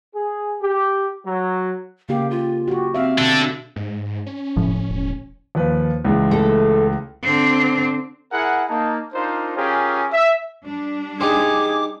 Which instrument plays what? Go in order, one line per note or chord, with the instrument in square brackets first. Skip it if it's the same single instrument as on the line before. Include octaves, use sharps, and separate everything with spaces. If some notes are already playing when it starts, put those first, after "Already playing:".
[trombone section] G#4
G4
F#3
[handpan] C#3 A#3 G4 [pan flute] F5
[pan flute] F4
[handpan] F#4 G4
[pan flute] C4 [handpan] E5 F5
[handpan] B2 D3 [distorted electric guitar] D4 A4
[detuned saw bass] G#2
C#4
[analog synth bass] F1 [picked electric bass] A2 F3
[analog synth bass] E1
[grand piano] D#2 F3 B4
C#2 E3 G#3
[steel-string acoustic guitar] A3 A4
[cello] D3 C4
[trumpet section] E4 G#4 A#4 F#5
A#3 D#4 A5
D4 D#4 F4 A#4 C5
C#4 F4 G4 G#4 A#4 C#5
E5
[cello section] G3 D4
[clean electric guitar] D#4 G4 C5 [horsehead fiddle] G#4 [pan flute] D6